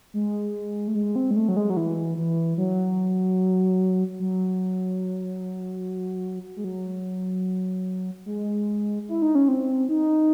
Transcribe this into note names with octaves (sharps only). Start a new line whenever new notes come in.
G#3
A3
G#3
C4
G#3
A3
F#3
G#3
F#3
E3
E3
F#3
F#3
G#3
F#3
G#3
E4
D#4
C#4
C4
D#4